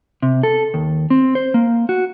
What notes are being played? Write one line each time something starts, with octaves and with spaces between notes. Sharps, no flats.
C3
A4
D#2
C4
C5
A#3
F#4